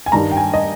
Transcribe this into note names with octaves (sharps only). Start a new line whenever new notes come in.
G#5
G2 D#3 G3 A#5
G5
G#5
D#5